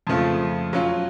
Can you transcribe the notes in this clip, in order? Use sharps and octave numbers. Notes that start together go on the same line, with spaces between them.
F2 C#3 F3 A3 F4
F#3 C#4 F4